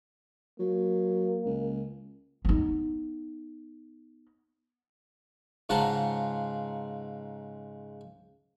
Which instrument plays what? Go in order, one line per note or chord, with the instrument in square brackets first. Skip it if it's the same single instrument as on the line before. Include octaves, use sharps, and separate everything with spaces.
[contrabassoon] F#3 [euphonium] A#3
[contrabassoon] C#2
[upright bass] B3 D#4
[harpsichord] G#2 C#3 F4 F#5 A5 A#5